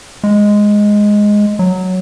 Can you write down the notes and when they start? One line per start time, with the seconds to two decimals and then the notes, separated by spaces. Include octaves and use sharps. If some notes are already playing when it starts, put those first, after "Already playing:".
0.24 G#3
1.59 F#3